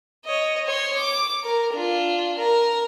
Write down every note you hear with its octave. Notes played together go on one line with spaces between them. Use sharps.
C#5 D#5
C#5 C6
D6
A#4
D4 F4
A#4